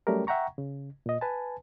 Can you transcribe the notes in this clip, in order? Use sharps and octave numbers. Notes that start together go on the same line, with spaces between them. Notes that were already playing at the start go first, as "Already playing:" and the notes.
F#3 G3 A3 C#4 G4 A#4
E5 F#5 G5 A#5 C#6
C#3
A#2 D#5
B4 G#5 A5